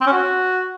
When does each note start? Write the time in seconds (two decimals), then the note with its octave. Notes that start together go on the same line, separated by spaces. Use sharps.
0.01 C4
0.06 C#4
0.12 F#4